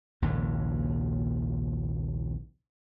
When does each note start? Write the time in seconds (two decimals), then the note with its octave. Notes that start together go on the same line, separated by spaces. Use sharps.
0.22 A#1 D#2 G#2 C#3